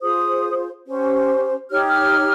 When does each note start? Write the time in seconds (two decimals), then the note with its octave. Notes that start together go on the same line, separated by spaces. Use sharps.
0.02 F4 G#4 C5 D#6
0.86 C#4 G4 C5
1.71 D#4 G4 C#5 F6
1.89 F6